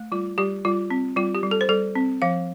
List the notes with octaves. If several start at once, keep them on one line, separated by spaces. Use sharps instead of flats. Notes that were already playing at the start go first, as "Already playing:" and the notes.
Already playing: A3
G3 F4
G3 G4
G3 F4
C4
G3 F4
G4
G3
A4
C5
G3 A4
C4
F3 F5